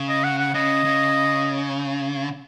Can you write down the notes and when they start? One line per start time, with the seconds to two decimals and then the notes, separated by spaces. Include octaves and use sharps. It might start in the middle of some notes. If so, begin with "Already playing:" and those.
Already playing: C#3
0.09 D#5
0.24 F#5
0.39 F#5
0.54 C#3 D#5
0.85 C#3